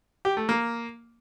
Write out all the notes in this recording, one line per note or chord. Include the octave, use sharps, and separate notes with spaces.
G4
A3
A#3